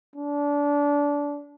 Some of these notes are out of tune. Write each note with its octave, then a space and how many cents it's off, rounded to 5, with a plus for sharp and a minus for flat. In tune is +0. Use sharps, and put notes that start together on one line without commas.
D4 -25